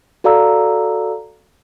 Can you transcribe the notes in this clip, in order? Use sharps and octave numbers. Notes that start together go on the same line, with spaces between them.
F#4 A4 D5 F5 A#5 E6